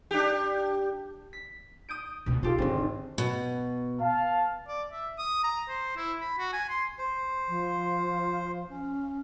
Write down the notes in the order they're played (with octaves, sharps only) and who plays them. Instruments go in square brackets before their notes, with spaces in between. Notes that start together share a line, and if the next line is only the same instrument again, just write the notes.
[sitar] D4 G4
[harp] B6
D#6 G6 D7
[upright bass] C#2 B2
[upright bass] D#4 [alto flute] F4 [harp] G4 A4 C5
[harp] G#1 [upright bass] D3 D4 [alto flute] C4
[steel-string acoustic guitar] B2
[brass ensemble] F5 A5
[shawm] D5
E5
D#6
A#5
C5
E4
B5
F#4
G#5
C6
[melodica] C5
[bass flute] F3
C#4